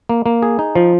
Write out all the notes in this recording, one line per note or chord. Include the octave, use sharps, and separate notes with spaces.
A#3
A#3
G#4
D#4
F3